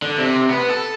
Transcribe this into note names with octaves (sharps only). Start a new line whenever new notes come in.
D3
C3
B3
A4